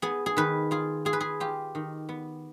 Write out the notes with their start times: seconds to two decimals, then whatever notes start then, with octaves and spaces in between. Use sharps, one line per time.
0.02 B3 G#4
0.26 G#4
0.37 D#3 B4
0.71 F4 G#4
1.05 F4 G#4
1.13 B4
1.20 G#4
1.40 F4 G4
1.75 D#3
2.09 B3